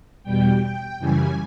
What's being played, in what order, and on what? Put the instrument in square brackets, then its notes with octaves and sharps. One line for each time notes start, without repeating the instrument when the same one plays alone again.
[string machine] E2 B2 G3 G5
G5
F#2 C#3 E3 G3 G#5